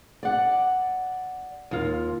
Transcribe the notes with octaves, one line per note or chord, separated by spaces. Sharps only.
D5 F#5
D#2 F4